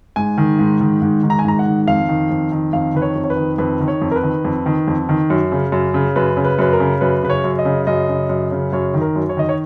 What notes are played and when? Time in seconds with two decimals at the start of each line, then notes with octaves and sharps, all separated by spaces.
0.16 G#2 G#5
0.38 D#3
0.59 G#2
0.81 D#3
1.02 G#2
1.23 D#3
1.30 A#5
1.39 G#5
1.45 G#2 A#5
1.59 F#5
1.66 D#3
1.87 F2 F5
2.09 D#3
2.30 F2
2.52 D#3
2.73 F2 F5
2.95 D#3 B4
3.02 C#5
3.16 F2
3.24 C#5
3.30 B4
3.37 D#3
3.58 F2 B4
3.80 D#3
3.88 C#5
4.02 F2
4.11 A#4
4.16 B4
4.23 D#3
4.45 F2
4.66 D#3
4.88 F2
5.09 D#3
5.30 F#2
5.52 C#3
5.72 F#2
5.94 C#3
6.16 F#2 B4
6.37 C#3
6.45 B4
6.59 F#2 B4
6.73 A#4
6.80 C#3
7.01 F#2 B4
7.23 C#3 B4
7.30 C#5
7.44 F#2
7.59 D#5
7.65 C#3
7.87 F#2 D#5
8.09 C#3
8.30 F#2
8.51 C#3
8.73 F#2 C#5
8.94 D#3
9.01 A#4
9.16 F#2
9.29 C#5
9.37 D#3 D#5
9.49 C#5